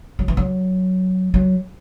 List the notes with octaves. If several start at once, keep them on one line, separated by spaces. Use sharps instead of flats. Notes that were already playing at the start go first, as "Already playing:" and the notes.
F#3
E3
F#3
F#3